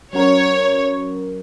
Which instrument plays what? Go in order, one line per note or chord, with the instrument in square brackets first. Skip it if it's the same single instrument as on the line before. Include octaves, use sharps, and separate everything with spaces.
[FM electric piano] F#3 C#4 F#4 A#4 [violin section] C#5